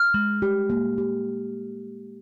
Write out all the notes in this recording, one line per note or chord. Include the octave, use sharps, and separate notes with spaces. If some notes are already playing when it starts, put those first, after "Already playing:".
Already playing: F6
G#3
G4
A#3
G4